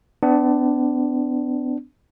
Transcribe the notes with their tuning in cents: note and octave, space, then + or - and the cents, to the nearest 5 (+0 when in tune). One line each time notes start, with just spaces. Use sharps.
B3 +40 D4 +0